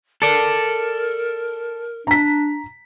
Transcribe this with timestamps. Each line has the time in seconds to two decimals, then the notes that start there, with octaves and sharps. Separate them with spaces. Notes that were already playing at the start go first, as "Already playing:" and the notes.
0.22 A4 A#4 D5
2.07 D4 A#5 B6